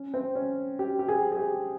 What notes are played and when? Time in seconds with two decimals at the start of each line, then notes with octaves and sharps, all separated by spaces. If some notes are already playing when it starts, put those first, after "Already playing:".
Already playing: C#4
0.14 C4
0.35 C#4
0.79 G4
0.99 G4
1.08 G#4
1.32 G#4
1.37 G4